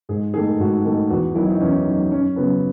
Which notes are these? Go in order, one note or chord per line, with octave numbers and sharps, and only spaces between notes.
G#2 G#4
D#3 A3 G#4
G#2 F#4
D#3 A3
E2 F#4
D#3 F#3 E4
D#4
E2 C#4
D#3 F#3
F#2 C#4
C#3 F#3 B3